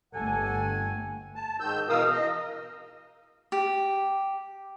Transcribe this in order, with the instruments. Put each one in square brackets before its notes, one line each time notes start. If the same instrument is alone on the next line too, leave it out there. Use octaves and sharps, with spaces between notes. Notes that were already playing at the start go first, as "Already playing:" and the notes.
[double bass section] G1 A3 [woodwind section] G4 F#5 G#5 [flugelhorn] A4
[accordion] A5
G#2 D#3 E6 G6
B2 E3 A#4 F5 D#6 E6
D#5
[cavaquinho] G4